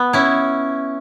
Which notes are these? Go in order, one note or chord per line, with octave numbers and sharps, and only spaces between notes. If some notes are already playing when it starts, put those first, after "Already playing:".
Already playing: B3
C#4 E4